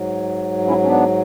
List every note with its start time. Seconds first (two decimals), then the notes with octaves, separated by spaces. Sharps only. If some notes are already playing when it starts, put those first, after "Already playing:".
Already playing: G#2 F#3
0.67 C#4 E4
0.83 C#4
0.87 B3 D4